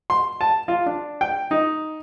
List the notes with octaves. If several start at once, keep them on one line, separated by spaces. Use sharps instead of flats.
C6
A5
F4
D4
G5
D#4